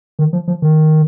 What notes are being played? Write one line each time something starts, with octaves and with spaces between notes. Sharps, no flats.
D#3
F3
F3
D#3